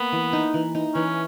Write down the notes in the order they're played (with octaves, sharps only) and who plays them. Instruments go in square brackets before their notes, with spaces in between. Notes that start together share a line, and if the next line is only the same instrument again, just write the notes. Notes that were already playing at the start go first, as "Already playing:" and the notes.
Already playing: [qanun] A#3 [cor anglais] B3
[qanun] E3
D#4
E3
D#4
[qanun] E3 [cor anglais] C#4